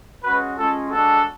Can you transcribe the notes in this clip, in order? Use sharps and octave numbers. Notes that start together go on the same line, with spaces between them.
G#3 C#4 F#4 B4
G#3 C#4 F4 A4
G#3 D4 F#4 A4